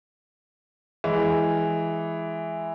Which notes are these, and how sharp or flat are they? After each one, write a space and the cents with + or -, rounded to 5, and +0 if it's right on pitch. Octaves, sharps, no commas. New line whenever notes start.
E3 +0 G#3 +0